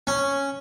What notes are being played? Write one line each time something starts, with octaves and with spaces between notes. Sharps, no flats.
C#4